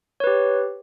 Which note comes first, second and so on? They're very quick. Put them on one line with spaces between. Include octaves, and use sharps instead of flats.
C#5 B4 G4